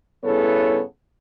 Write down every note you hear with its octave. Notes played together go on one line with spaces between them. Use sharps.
G2 C#3 B3 E4 A4 C#5